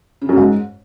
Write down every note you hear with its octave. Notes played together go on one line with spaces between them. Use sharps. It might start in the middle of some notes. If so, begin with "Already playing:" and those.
C#3
F#2
G#2